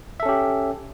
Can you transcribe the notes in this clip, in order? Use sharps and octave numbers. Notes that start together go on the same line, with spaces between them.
C#4 G4 A4 E5